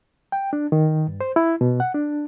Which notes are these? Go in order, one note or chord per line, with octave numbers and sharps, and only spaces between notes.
G5
D4
D#3
G2
C5
E4
B2
F#5
D4